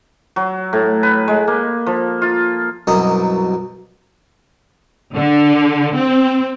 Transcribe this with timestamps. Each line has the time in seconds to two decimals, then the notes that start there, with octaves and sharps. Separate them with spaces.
0.36 F#3
0.73 A2
1.03 B4
1.28 G#3
1.48 A#3
1.86 F3
2.22 F4
2.87 C2 F#2 B2 D#5 A#5
5.13 D3
5.95 C4